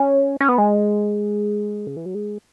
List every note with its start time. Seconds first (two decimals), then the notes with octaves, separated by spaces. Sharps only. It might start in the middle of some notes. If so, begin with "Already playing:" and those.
Already playing: C#4
0.41 C#4
0.49 B3
0.58 G#3
1.87 C#3
1.96 E3
2.06 F#3
2.14 G#3